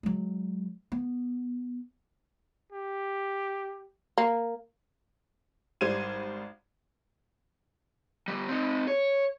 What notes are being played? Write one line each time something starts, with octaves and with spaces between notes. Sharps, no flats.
F#3 G#3
B3
G4
A#3
G#1 G3 C5 G#6 D#7
D3 G3
C4 D#4
C#5